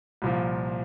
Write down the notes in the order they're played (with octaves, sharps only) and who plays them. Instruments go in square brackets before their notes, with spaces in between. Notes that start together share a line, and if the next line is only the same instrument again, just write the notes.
[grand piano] C2 A#2 F3